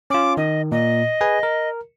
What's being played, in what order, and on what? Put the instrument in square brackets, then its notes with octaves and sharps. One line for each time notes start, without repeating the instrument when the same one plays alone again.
[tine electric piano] C#4 F4 [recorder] D6
[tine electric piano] D#3 [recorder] D#5
[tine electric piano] A#2 [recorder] D#5
[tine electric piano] G#4 B4 G#5
A#4